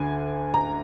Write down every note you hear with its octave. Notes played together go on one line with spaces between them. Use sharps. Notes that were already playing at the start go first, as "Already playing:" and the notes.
Already playing: D2 D3 G#5
A#5